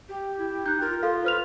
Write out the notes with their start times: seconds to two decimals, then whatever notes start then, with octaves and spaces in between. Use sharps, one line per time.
0.09 G4
0.38 E4
0.66 D#4 F#6 G6
0.81 F4 A#4
1.03 A4 F5 C6
1.25 B4 C5 F6 F7